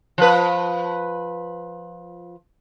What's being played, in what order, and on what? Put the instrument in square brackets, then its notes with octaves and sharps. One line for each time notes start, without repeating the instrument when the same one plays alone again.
[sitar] F3 B4